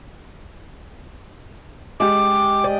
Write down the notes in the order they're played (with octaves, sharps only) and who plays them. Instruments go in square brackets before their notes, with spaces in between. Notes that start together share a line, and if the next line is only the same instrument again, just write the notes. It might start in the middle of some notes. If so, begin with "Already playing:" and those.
[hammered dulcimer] G#3 G4 [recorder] D6
[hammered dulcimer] D5 D#5